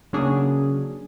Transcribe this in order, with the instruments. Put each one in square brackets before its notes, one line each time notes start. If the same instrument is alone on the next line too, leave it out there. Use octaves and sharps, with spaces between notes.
[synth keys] C#3 F#3 A#3 C#4 D4 G#4